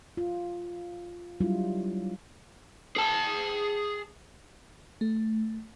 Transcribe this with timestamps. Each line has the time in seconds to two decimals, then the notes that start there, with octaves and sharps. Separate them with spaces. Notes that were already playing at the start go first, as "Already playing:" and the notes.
0.17 F4
1.40 F#3 G3 D4 E4 F4
2.96 G#4 A5
5.01 A3